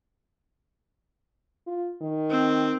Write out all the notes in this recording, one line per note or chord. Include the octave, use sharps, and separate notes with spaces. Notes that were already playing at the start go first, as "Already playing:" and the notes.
F4
D#3
C4